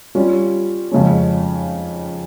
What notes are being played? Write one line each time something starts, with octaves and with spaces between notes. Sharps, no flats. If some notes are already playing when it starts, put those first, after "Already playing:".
G3 C#4 F4
F2 C#3 G#3 C#4